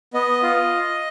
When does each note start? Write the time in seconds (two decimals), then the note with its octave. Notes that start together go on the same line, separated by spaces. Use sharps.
0.14 B3 D#5
0.43 F4